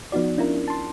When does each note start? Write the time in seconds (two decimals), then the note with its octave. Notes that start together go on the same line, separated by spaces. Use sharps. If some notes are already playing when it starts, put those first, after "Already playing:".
0.12 F3 B3 D#4 F#4 D5
0.37 C#4 D4 E4 F4 A#4
0.68 A5 C6